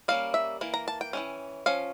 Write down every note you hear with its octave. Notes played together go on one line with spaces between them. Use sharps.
G3 A#3 C#4 F5
E5
E3 A#3
A#5
A5
G5
E3 A#3 C#4
F3 C#4 F5